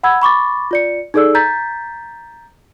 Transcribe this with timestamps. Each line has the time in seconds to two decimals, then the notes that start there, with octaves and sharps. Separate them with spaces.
0.03 F#5 B5 E6 G#6
0.22 B5 C#6 D6 A6
0.71 F4 D5 C#7
1.14 D#4 G#4 A4 D5 E6
1.35 A#5 G6 A6 B6